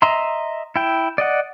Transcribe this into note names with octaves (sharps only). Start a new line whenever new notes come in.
D#5 E5 A#5 C6
E4 G5
D5 D#5 F#5